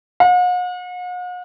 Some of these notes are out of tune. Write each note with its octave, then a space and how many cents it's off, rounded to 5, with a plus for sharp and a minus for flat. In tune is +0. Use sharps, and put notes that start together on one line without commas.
F#5 -45